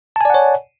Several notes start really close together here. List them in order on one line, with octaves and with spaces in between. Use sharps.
A5 G#5 D5 F#5 C#5